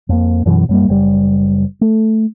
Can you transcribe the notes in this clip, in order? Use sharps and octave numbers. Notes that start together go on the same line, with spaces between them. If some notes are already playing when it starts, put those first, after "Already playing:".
F2 A#3
F#2 B2 E3 F#3
F#2 G3 A#3
F#1 G3
A3